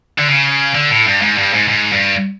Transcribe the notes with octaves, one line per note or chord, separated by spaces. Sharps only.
D3
C#3
D3
A2
G2
G#2
G2
G#2
G#2
G2